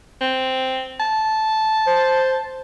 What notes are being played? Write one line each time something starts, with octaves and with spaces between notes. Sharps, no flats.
C4
A5
C5